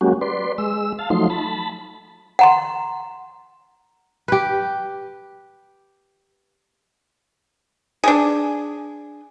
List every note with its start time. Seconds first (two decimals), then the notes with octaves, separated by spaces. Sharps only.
0.01 F#3 G#3 A#3 C#4 F#4 G4
0.21 B4 D5 C6
0.58 G#3 E6
0.99 F5 A5
1.10 F3 F#3 A3 D#4 C6
1.30 A5 B5
2.39 F#5 A#5 C6
4.28 G4 B4
8.04 D4 G#4